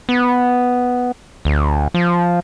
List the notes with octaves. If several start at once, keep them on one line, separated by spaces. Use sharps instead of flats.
B3
D2
F3